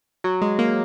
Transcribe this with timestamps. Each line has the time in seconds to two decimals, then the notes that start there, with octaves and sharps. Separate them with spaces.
0.24 F#3
0.42 G#3
0.59 A#3